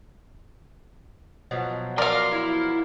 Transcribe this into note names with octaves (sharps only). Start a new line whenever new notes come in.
B2 F3 F#3
A#4 D5 F5 C6
E4